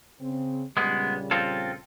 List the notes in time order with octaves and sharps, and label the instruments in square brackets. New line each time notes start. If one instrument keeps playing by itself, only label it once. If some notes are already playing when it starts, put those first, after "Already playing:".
[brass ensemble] C#3 C4
[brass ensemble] A#1 C#3 G3 [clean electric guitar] G#3 B3
[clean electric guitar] C4 F4 A4